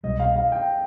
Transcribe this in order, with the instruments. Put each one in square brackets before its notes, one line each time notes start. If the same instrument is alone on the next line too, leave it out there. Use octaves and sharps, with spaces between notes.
[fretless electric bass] C2 B2 G3 [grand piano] D#5
[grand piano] F5
F5
G5